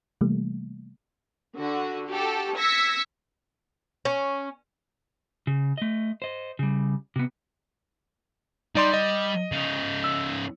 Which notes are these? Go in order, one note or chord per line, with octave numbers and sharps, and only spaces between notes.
C3 E3 G3 A3 A#3
D3 F#4
F#4 G4 A4
E6 G#6 A#6 B6 C#7
C#4
C#3
A3 D#5
C5 D#5
C#3 G3
C3 B3
G3 D#4 D5 C6
D#5
C#3 D#4
E6